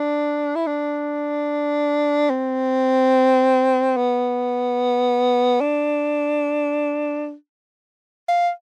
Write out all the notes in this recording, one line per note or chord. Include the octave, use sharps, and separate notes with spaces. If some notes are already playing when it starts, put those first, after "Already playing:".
Already playing: D4
E4
D4
C4
B3
D4
F5